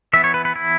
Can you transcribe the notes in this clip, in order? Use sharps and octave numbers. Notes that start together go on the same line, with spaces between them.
E3 B3 E5
C#5
B4
B4
E4